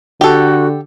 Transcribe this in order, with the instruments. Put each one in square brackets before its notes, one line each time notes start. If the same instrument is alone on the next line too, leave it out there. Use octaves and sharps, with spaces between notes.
[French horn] D3 [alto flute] F#4 [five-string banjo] G4 A4